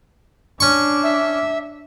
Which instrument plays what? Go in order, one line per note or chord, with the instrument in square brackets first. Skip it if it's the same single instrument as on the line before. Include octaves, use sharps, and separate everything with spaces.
[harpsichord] C#4 C#6 [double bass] D4
[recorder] E5